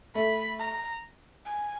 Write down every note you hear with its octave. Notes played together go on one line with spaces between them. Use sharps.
A3 B5
A#5
G#5